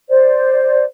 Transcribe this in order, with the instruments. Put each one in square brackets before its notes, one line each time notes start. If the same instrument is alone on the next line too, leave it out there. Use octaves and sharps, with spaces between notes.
[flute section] C5 D5